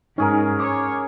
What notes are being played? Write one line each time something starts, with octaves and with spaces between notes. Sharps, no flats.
G#2 C#4 D#4 G#4 A#4 G#5
C#5 D6